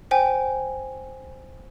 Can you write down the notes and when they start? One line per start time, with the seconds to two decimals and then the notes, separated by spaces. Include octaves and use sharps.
0.11 C5 G5 G#5